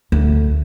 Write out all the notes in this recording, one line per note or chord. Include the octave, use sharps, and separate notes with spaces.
D2